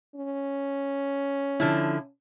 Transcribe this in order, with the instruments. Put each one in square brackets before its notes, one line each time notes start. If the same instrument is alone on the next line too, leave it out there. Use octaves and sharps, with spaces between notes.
[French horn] C#4
[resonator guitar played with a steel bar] D3 F3 E4